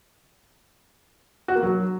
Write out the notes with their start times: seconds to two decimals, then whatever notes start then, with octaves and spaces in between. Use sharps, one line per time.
1.48 F#4
1.56 A#3
1.63 F#3